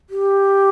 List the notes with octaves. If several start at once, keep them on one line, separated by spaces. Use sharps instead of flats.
G4